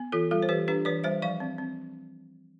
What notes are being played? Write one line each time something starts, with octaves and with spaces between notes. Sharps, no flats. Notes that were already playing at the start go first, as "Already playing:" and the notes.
Already playing: B3
E3 F4 A4
G3 F4 A4
C5
E3 G4 B4
D4 G4 B4
E3 B4 D5
G3 C5 E5
F3 D5 F5
C4
C4